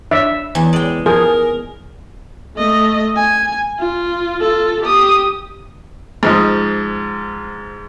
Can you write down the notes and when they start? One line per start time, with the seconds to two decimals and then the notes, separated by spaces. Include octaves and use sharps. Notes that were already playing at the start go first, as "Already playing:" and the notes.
0.11 D4 C#5 E5
0.55 E2
0.73 G#3 D5 G5
1.06 F3 G#4 A#4
2.56 A3 D#5
3.17 G#5
3.79 F4
4.41 F4 A4
4.82 G4 D#6
6.23 G#2 F3 D#5